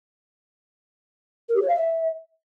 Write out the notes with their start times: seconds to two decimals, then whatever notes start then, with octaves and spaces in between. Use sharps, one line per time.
1.49 A#4
1.55 G4
1.62 C#5
1.68 F5
1.75 E5